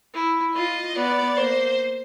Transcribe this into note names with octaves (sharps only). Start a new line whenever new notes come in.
E4
F4 D#5
B3 D5
A#3 C5